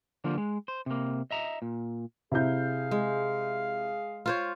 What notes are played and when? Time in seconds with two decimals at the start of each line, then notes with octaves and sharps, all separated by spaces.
0.24 D3 F3 G3 A#3
0.38 G#3
0.68 C5
0.86 C3 A#3
1.31 D#5 E5 A#5
1.62 A#2
2.32 C3 E4 G#4 F5 G6
2.91 G#3
4.26 F4 C5 C#5